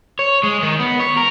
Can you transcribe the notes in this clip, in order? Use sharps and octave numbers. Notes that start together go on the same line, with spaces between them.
C#5
G#3
D#3
B3
C#5
A#4